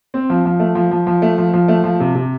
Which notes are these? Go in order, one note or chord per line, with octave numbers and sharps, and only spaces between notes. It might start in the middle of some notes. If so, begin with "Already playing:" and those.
C4
F3
F3
A3
F3
F3
F3
A3
F3
F3
A3
F3
C3
C3